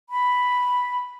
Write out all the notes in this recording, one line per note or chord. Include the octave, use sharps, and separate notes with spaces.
B5